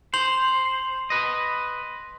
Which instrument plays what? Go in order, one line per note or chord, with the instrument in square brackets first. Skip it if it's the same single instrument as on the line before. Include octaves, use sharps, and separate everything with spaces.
[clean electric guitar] C5 [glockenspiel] C6 F7 F#7
[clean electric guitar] B4 D#5